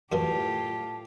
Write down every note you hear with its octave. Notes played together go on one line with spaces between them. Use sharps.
F#2 A2 D3 E3 F4 G4 A5